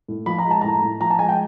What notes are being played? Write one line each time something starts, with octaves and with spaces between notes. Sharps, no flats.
A2
F3 B5
A#5
G#3
A5
A2 A#5
A2
F3 A#5
A5
G#3 G#5
G5